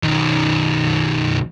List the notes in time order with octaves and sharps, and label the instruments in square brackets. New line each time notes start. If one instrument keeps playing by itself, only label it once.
[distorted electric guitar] B1 D#3